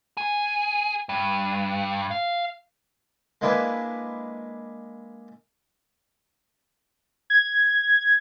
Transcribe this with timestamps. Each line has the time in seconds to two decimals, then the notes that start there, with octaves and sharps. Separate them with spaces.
0.17 G#4
1.09 G2
2.11 F5
3.41 G#3 A#3 D4 E4 B4 G#5
7.30 G#6